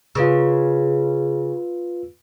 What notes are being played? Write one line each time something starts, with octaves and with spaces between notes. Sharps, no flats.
C#3 F4 B4 E6